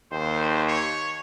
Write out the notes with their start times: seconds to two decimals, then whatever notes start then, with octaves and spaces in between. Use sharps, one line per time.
0.12 D#2 C5
0.67 C#5